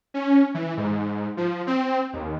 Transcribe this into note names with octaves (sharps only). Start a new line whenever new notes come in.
C#4
E3
G#2
F3
C4
D#2